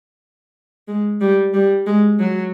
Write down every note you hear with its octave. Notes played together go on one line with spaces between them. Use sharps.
G#3
G3
G3
G#3
F#3